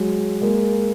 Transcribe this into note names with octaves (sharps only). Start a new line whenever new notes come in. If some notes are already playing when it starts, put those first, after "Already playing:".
Already playing: F#3 G#3
G#3 A#3